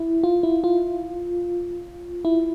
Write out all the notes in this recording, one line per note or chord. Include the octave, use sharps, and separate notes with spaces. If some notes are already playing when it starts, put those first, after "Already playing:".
Already playing: E4
F4
E4
F4
E4